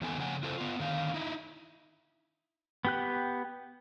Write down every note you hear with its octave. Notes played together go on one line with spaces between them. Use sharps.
E2 D#3 B3 A4 G#5
C#3 F3 F#5 G#5
E4 F4 A4 B4 C5
B3 F4
D3 D#3 F5
D#4 E4
B3 G4 F#6